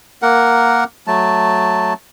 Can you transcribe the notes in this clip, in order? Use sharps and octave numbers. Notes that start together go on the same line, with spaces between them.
A#3 A#4 F#5
F#3 A3 A5